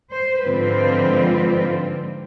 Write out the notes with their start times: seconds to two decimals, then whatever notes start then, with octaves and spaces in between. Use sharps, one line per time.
0.11 C5
0.42 G#2 D3 F3 C4 F4 B4